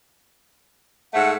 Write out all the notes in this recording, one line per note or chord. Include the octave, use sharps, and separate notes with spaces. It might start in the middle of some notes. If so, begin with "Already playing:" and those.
G#2 A3 F#5